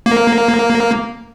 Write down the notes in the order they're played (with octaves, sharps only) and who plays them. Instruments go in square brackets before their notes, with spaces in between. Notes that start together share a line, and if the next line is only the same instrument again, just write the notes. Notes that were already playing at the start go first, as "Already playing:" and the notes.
[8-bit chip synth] A#3